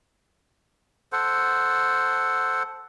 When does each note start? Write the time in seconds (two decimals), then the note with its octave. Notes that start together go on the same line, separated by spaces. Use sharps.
1.12 A4 C5 F#5